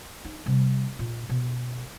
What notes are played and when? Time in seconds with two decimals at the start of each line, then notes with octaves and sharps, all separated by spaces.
0.25 D#4
0.46 C3 G3
0.99 A#2
1.29 B2